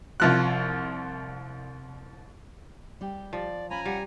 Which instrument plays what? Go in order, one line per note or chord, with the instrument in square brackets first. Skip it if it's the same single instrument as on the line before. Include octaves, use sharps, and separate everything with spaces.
[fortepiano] C2 F3 F#6
[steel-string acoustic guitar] G3 G4
[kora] F3 [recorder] D5
[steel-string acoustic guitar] C#4 F4 [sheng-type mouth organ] G#5 A#5 [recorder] B5
[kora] G3 [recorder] F#5